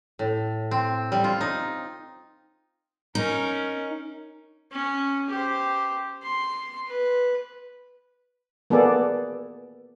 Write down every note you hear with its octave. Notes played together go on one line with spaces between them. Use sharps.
A2
C4
G3
F4
D#4
C#4 D#4 A#4
C#4
G4 C5
C6
B4
A#3 B3 G#4 A4 D5